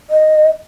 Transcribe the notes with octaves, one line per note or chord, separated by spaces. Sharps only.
D#5